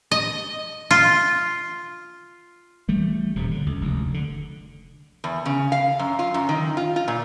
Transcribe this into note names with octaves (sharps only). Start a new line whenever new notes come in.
D#5
F4
E3 G3 A3
D#1 F#2 C3
D3
C#2
F1 D2
D3
E2
C#3
F5
F#2
F4
F#2
D#3
F4
F4
A#2